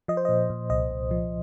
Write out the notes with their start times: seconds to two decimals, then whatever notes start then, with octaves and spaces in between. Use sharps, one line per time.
0.08 F3 D#5
0.17 C5
0.25 A#2 D#5
0.50 A#2
0.70 C2 D#5
0.91 C2
1.11 F3